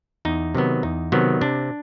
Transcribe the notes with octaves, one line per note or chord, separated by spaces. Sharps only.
E2 D#4
C3 D#3 F#3 B3
E2 D#4
C3 D#3 F#3 B3
C3 D4